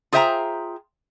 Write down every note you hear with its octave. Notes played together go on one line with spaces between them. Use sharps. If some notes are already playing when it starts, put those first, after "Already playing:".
F4 G#4 C5 E5 G5 A#5